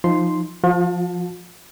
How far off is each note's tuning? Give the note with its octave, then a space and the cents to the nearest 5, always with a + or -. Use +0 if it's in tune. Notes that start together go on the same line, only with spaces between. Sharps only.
F3 +0 D#4 +0 C6 +0
F3 +0 F4 +45 A5 +5